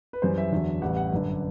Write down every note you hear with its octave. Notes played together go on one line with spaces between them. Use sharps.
B4
F#2 E3 G3 C5
E5
E2 D3 F#3
A1 A2 E3 G3 F#5
F#5
G1 F#2 D3 B4